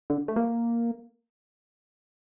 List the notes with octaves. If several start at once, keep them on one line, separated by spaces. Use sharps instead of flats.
D3
A3
A#3